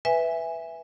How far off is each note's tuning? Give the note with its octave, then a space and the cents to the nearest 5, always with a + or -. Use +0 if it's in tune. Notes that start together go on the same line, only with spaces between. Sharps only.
B4 +0 E5 +0 G#5 -15